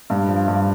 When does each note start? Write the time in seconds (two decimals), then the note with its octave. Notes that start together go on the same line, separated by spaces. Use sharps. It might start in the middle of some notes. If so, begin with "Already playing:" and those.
0.10 G2
0.29 F3
0.48 G2